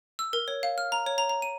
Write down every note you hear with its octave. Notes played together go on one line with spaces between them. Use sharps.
E6
A#4
C#5
F5
F6
A#5
C#5
A#5
A#5
D#7